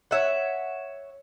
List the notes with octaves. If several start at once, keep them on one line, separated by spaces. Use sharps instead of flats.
C#5 E5 F#5